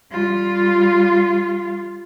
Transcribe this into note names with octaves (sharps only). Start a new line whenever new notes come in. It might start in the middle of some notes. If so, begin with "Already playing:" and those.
G3 F4